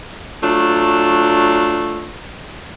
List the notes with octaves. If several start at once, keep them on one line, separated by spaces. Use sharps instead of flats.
F#3 A3 D4 F4